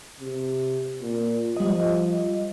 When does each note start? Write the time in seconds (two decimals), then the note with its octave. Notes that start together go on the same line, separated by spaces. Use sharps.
0.20 C3
1.02 A#2
1.57 F3 G3 D#5